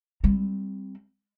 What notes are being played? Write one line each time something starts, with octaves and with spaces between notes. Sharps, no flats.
G3 C4